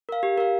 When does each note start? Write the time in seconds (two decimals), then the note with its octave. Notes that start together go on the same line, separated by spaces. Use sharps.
0.09 A#4 F5
0.23 G4
0.38 A#4 F5